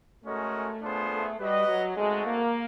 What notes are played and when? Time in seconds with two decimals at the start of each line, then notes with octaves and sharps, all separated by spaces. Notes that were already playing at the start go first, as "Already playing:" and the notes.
0.24 G#3 A3 C#4 F#4 A#4 D#5
0.82 B3 D4 F4 G#4 C5
1.10 A3
1.39 G3 F#4 B4 D#5
1.67 F#3
1.96 G#3 A3 C4 D#4 F#4 A4
2.25 A#3